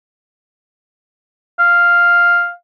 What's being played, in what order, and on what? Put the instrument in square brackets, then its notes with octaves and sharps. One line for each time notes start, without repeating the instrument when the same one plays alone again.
[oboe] F5